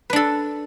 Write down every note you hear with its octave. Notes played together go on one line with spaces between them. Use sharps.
D4 A4 B4